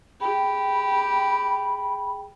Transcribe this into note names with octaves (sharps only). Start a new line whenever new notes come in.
G4 G#4 G5 B5